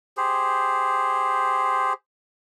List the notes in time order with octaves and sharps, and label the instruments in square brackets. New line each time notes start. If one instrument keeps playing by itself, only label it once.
[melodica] G4 G#4 C5